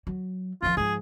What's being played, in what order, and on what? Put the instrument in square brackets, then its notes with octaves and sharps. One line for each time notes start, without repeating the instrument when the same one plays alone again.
[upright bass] F#3
[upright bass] F#2 F3 [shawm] F4
[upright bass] G#2 F3 [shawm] G#4